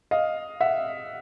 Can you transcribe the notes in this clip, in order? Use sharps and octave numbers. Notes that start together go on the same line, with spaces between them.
D#5 F5
E5 F#5